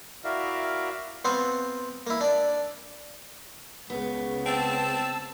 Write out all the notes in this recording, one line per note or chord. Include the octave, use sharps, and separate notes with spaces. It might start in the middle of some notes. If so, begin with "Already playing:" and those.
E4 F#4 A#4 D5 E5 F5
B3 C4 F4 F#5 C#6
A#3 E4
D4 D5
C#2 C#3 B3
C4 A5 E6